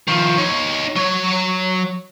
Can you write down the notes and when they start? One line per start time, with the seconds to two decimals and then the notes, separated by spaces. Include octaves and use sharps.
0.08 D#3 F3
0.38 D#4 C#5
0.96 F#3 C#5